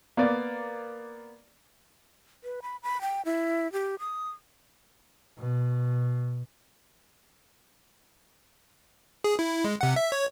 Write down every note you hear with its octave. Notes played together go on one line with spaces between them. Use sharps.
A#3 B3 D5
B4
B5
B5
G5
E4
G4
D#6
B2
G#4
E4
G#3
C3 F#5
E5
C#5